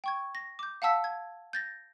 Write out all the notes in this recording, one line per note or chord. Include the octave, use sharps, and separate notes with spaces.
G5 C#6 G#6
A#6
D6 G6
F5 F#5 A5 E6 B6
G#6
G6 A6 A#6